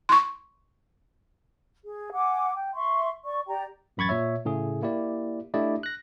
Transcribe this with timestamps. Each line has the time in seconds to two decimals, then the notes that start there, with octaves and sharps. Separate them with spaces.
0.09 C6 C#6
1.84 G#4
2.13 F#5 G#5 D6
2.55 G5
2.74 E5 C6 C#6
3.24 D5 C#6
3.48 G4 D5 G5 A#5
3.97 A1 F#2 B5 C#6 G#6 A6
4.09 A#2 C#5 E5
4.45 A2 C#3 A3 G#4
4.82 A#3 E4 G4 D5
5.54 A3 D4 E4 G4 D5 D#5
5.83 F#6 A#6